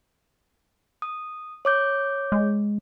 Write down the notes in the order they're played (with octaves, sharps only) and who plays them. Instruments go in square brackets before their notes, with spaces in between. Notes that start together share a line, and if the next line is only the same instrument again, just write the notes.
[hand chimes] D#6
C#5 D6 G6
[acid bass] G#3